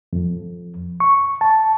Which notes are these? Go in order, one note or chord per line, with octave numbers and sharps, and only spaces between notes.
F2
C#6
A5